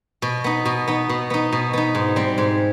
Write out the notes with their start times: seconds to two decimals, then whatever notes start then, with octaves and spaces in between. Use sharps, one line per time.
0.22 B2
0.44 B3 D#4
0.66 B2
0.88 B3 D#4
1.10 B2
1.30 B3 D#4
1.52 B2
1.73 B3 D#4
1.95 G#2
2.16 G3 C4
2.38 G#2